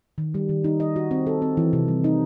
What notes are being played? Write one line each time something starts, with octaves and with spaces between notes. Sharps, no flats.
D#3
G3
D#3
D#4
D#5
F#4
C4
A4
C4
E3
C3
G3
D#4